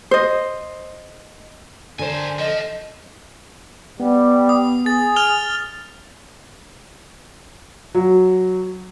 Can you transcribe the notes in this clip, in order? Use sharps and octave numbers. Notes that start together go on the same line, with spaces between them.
C5 D#5
G2 D3 A4 A#4 C5 G#5
F3 D#5
G3 B3
D#6
G#4 A6
F6 F7 G7
F#3